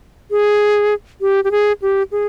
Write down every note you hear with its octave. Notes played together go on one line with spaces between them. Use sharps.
G#4
G4
G4
G#4
G4
G#4